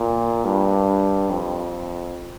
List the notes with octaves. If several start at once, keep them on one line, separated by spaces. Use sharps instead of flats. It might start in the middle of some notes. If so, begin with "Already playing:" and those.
Already playing: A#2
G2
F2